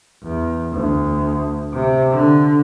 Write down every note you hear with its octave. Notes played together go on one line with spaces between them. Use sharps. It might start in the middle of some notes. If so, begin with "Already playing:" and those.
E2
D2
C3
D3